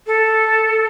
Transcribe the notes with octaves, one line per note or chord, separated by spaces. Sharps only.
A4